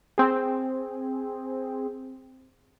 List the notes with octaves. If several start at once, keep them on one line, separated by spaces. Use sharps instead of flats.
C4 G#4